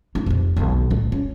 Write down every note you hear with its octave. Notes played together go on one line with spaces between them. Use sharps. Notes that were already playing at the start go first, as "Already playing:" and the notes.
C4 D#4
F2 C3
B1 D#3
A1 D2
C#4